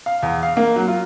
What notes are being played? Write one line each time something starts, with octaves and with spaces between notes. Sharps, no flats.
F5
E2
F5
A#3
F#3
F4